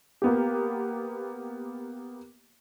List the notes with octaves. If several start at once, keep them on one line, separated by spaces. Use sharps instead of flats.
A#3 B3 G4